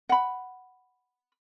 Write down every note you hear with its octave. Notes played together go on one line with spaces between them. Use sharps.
F#5 B5